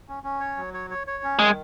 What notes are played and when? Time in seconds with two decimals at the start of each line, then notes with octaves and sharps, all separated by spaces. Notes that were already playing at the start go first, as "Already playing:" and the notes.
0.08 C#4
0.24 C#4
0.40 C#5
0.57 F#3
0.74 C#5
0.90 C#5
1.07 C#5
1.24 C#4
1.39 D#3 G#3